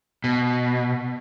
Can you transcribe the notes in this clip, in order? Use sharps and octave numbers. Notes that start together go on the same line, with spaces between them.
B2